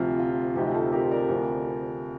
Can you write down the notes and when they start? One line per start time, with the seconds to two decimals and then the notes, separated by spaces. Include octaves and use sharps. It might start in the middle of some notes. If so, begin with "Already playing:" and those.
Already playing: D2 C3 F3 F4
0.19 F4
0.55 D2 C3 F3 C4 D#4 G4
0.74 F4 A4
0.92 G4 A#4
1.11 A#4 D5
1.29 D2 C3 F3